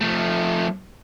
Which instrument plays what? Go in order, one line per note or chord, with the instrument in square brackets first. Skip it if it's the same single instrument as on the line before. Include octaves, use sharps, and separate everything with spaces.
[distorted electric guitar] F3 A3